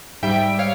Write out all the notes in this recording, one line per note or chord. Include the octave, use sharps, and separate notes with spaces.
G#2 G3 E5 G5
C#5 F5